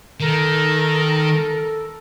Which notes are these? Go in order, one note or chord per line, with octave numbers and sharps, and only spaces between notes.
D#3 A4 A#4